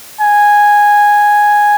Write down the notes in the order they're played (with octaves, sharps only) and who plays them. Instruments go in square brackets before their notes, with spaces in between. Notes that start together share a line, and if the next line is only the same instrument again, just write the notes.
[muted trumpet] G#5